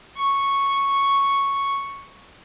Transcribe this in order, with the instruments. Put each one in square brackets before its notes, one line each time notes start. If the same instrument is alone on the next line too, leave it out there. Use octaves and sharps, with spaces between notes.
[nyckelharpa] C#6